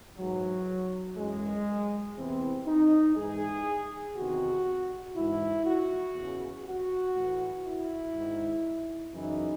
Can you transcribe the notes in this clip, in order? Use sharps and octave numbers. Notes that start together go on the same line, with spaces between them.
G#2 E3 F#3
F#2 E3 G#3
E2 C3 E3 C4
D#4
G#2 E3 G#4
E2 C3 D#3 F#4
G#2 E3 E4
F#4
E2 C#3 E3
F#4
A2 E3
E4
G#2 D#3
F#2 C#3 E3 D#4